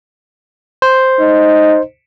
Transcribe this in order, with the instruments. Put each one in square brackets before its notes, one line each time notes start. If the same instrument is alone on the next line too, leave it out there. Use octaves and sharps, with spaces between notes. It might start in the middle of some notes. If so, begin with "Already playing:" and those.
[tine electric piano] C5
[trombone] D#4